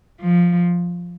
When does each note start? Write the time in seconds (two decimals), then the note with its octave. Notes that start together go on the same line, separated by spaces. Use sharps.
0.21 F3